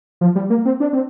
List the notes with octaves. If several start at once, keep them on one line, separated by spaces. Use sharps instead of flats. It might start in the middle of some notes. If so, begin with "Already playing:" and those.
F3
G3
A#3
C4
D4
C4